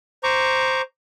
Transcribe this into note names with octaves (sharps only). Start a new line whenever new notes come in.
C5 A#5 C#6 D6